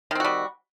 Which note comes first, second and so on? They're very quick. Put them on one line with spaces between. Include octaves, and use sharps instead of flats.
D#3 C4 F#4 G3